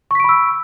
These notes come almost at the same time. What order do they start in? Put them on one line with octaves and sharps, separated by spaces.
C#6 B6 D7 B5 E6